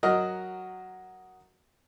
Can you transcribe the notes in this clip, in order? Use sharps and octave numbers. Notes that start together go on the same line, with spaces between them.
F#3 F#4 A#4 D#5